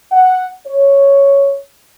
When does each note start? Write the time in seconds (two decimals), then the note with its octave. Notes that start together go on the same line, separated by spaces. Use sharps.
0.12 F#5
0.67 C#5